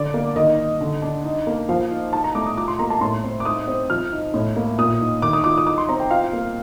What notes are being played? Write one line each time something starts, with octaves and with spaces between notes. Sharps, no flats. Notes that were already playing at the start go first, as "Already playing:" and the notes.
Already playing: D3 D4 D5
A#3
D#3 D#5
D#4
D3
D4
D#4
A#3
F3 F5
D#4
D#4 A5
A#5
A3 D6
D#6
F4 D6
C6
A#3 A#5
A5
A2 C6
C4
D6
D#4 D#6
C4
F3 F6
D#4
A2
A#3
A#2 D#6
D#4
D#3 D6
D#6
F4 D6
D#6
D#4 D6
C6
C4 A#5
G5
F4 F5
A#3